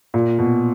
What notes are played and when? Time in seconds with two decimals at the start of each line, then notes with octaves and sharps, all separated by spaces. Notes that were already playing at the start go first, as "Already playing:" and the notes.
0.14 A#2
0.39 B2